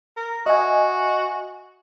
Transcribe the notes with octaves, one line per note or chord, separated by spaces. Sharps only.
A#4
F#4 D#5 E5 G#5